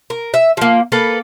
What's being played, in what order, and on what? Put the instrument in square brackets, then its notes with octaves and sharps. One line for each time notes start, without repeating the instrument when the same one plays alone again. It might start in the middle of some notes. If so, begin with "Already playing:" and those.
[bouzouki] A#4
E5
F3 A#3
A#3 A4 B4